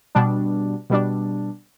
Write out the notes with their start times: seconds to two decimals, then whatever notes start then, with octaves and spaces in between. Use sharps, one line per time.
0.15 B2 G3 D4
0.90 B2 G3 D4